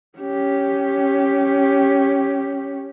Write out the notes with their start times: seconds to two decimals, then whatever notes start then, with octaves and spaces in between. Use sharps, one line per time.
0.19 C#4 G4